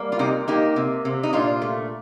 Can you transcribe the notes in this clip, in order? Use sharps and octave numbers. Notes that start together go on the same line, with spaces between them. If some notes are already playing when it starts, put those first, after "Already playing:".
Already playing: G3 A#3
F4
C3 D#4 G4
A#3 D#4 G4
C3
C3
D#4
A#2 D4 F4
A3